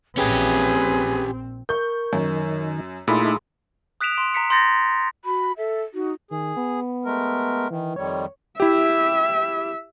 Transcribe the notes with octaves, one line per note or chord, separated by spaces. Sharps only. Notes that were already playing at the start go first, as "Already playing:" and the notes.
A#1 C4 C#4 G4 G#4 B4
A#4 C#6 G6
F#2 D#3
A#2 A3 D#4 E4 G#4 B5 C6
D#6 F#6 B6 D7 E7 F7
C6 D7
A#5 B6 C#7
C6 F#6 G6 A6 A#6 C#7
F#4 B5
A4 E5
D#4 F#4
D#3 G#4
B3
G#3 A3 A#4
D#3 E3
F2 D#3 G3 C#5
E4 G4 E5